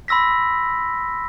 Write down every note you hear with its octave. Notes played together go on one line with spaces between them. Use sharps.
B5 C6 E6 A#6 B6